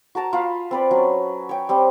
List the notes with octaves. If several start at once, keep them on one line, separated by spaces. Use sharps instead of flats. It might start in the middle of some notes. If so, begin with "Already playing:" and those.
F#4 A#4 A5 A#5
F4 F5 B5
C4 B4 D5
F#3 C#4
C#5 G5
G3 C4 G4